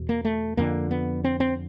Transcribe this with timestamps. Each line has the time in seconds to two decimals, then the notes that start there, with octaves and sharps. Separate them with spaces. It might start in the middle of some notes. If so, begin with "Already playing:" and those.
Already playing: E2 B2
0.09 A#3
0.25 A3
0.57 F2 D3 A#3
0.91 B3
1.24 C4
1.40 C4